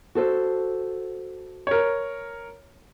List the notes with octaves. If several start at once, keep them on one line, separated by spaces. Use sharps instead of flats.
F#4 A4 C5
A#4 C#5